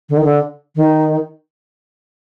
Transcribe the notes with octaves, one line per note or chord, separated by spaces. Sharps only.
D3
D#3
D3
D#3